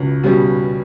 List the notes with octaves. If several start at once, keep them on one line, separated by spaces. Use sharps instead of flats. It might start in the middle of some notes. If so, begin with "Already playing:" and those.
Already playing: C#2 B2 C#4
B2 G3 C#4